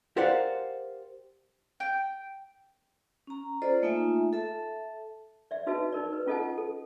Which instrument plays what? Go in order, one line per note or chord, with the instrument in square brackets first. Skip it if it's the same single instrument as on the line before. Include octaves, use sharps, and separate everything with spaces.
[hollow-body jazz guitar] G4 A#4 C5 D5 F5 F#5
[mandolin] G5
[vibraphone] C#4 A#5
F4 A4 C5 D5 D#5
A3 A#3 D#4 F4 E5 G#5
A4 E5 A5
[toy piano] D5 E5
D#4 F#4 B4 D#5 E5 A5
D#4 A#4 D5
B4
C#4 F4 A4 D#5 F#5 A5
A4